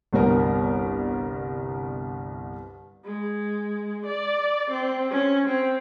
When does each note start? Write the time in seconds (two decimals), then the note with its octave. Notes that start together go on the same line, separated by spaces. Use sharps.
0.13 G1 C2 G3 B3 A#4 A#5
3.05 G#3
4.06 D5
4.71 C4
5.11 C#4
5.47 C4